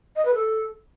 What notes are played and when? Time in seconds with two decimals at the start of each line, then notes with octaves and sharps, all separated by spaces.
0.16 D#5
0.25 B4
0.35 A4